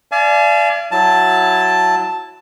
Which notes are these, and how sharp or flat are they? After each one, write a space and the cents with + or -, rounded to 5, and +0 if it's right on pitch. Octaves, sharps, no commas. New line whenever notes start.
D5 +0 F5 -35 G#5 +40
F#3 -5 E4 +0 A5 +0